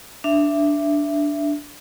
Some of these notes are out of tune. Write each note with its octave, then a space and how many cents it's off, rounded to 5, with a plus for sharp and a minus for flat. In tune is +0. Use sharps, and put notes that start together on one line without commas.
D4 +0 E5 +15